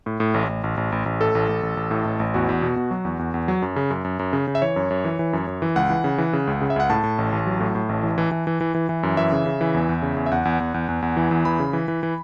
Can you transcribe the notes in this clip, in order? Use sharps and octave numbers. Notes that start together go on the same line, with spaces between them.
A2
A2
A1
A1
A1
A1
A1
A1
A2 A4
A1
A1
A1
A1
A2
A1
A1
E2 F#4
E2
B2
B2
F#3
E2
E2
E2
F#3
F#2
C#3
F#2
F#2
F#2
C#3
C#3
E5
E3 C#5
F#2
F#2
E3
E3
F#2
F#2
E3
C#2 F#5
E3
C#3
E3
C#3
C#2
C#3
E5
C#2 F#5
A2 A5
A2
A1
A1
F#3
A2
A2
A1
E3
E3
E3
E3
E3
E3
E3
F#2
E3 E5
C#3
C#3
E3
E2
E2
C#3
E2
E5
E2 F#5
E2
E2
E2
E2
E2
E3
E2
E3 B5
C#3
E3
E3
E3